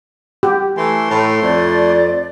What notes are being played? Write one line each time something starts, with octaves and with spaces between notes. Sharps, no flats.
G4
E3 A3 C6
A2
F2 D5